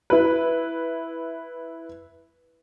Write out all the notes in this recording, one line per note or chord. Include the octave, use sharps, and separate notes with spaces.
E4 B4